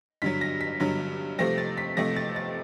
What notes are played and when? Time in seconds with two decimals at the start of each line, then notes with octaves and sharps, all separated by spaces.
0.22 G2 D3 F#3 B6
0.41 A#6
0.61 B6
0.80 G2 D3 F#3
1.38 C3 F3 A3 C4 A#6
1.58 A6
1.78 B6
1.97 C3 F3 A3 C4 A#6
2.16 A6
2.36 A6